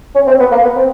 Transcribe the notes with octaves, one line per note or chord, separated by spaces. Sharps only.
C#4
C4
B3
A#3
B3
C4